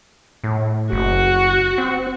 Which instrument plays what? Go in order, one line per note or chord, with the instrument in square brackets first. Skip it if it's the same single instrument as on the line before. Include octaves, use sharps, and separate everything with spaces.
[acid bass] A2
[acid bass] F#1 [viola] F#4
[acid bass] C4